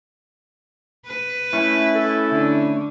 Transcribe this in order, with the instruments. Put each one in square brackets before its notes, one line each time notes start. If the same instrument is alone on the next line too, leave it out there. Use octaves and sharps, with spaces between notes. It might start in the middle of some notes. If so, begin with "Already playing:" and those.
[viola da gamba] B4
[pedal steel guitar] A3 C#4 [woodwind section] E4
[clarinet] A4
[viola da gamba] D3